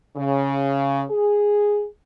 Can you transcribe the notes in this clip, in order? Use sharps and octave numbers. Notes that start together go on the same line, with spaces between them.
C#3
G#4